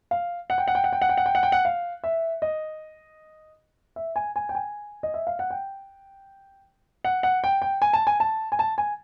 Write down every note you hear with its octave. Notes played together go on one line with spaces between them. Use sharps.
F5
F#5
G5
F#5
G5
F#5
G5
F#5
G5
F#5
G5
F#5
G5
F#5
F5
E5
D#5
E5
G#5
G#5
G5
G#5
D#5
E5
F5
F#5
G5
F#5
F#5
G5
G5
G#5
A5
G#5
A5
G#5
A5
G#5